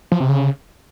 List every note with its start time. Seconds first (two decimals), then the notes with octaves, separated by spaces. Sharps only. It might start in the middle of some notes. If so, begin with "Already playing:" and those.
0.12 F3
0.20 C3
0.29 C#3